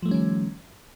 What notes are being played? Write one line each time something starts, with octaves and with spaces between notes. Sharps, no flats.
D#3 F3 G3 A3 C#4